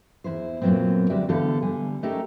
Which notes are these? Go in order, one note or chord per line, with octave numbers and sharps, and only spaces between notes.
E2 G2 E4 C5
F#2 A#2 E3 F#3 B3 C4
D2 G3 G#3 F#4 D5 E5
D3 E3 B3 G4 A4 F5
D3 G3 G#5
A3 C#4 D#4 G4 A4 A#4